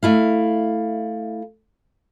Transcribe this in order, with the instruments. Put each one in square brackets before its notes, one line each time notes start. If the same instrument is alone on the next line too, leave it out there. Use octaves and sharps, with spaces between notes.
[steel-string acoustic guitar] A3 E4 F5